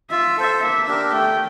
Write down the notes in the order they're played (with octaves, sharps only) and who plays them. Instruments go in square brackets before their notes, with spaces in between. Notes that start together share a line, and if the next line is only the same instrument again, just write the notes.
[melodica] F4 [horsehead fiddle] E5
[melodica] A4 C5
[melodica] A#3 [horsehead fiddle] E5
[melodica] D4 G4 A#4
[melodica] A3 [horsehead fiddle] G5